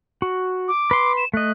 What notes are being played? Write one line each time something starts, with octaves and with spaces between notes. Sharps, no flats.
F#4
D6
B4 C6
E7
A3 D#5 F#6